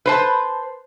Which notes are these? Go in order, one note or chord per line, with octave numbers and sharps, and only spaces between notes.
B4 C5 A5